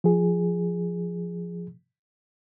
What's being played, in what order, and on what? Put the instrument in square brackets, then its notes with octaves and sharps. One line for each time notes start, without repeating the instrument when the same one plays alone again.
[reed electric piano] F3 G#4